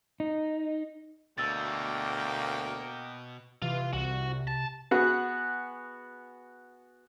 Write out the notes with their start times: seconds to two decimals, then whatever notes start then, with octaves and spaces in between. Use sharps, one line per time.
0.20 D#4
1.38 D2 B2 A#3 G5 E6 A6
3.62 C3 E3 F4
3.93 C2 F#4
4.47 A5
4.91 B3 F#4 G#4 F#5